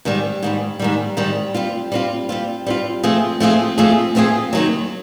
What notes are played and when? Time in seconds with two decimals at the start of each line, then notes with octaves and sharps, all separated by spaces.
0.05 G#2 D#3 G3
0.42 G#2 D#3 G3
0.80 G#2 D#3 G3
1.17 G#2 D#3 G3
1.54 G3 C4 F4
1.92 G3 C4 F4
2.29 G3 C4 F4
2.67 G3 C4 F4
3.03 F3 A3 C4 F4 G#4
3.40 F3 A3 C4 F4 G#4
3.78 F3 A3 C4 F4 G#4
4.15 F3 A3 C4 F4 G#4
4.53 D#2 D#3 F#3